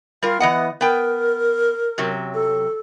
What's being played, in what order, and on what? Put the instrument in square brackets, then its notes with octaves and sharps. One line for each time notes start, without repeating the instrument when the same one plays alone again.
[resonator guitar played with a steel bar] G3 A#4 [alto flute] F4
[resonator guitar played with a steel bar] E3 D#5 F#5 [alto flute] B3
[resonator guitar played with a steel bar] B3 G5 [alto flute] A#4
[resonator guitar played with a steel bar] F#2 C3 F#3
[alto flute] A4